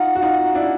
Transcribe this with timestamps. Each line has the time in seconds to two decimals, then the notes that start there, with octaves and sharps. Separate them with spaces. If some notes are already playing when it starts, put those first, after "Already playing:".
Already playing: D#4 F4 F#5
0.15 F#4
0.22 D#4 F4
0.55 D4 E4